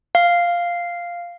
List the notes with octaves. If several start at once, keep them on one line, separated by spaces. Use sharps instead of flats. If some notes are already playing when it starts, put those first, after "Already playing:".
F5